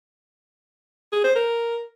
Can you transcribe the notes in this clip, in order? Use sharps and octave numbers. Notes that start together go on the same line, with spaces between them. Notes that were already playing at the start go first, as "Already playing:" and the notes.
G#4
C5
A#4